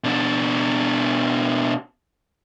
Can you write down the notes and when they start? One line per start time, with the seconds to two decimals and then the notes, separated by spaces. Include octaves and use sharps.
0.04 B2 D4